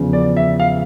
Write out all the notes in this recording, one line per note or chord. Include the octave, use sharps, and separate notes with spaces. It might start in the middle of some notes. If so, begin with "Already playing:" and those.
Already playing: E2 C#3 F3
D5
E5
F5